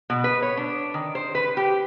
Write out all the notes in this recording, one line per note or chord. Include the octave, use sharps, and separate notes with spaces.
B2
B4
C#5
D4
D#3
C5
B4
G4